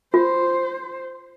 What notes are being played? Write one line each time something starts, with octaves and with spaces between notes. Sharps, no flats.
F4 C5